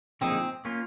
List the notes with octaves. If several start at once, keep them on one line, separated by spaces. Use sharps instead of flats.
D3 F3 A#3 C4 D#4 G#4
A#3 C#4 F4